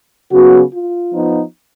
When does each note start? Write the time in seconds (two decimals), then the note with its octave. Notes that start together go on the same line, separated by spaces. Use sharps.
0.32 C#3 F#3 B3 F#4
0.73 F4
1.14 F3 B3 D#4